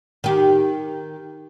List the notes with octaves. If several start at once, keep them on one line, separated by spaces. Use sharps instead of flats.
D#3 G4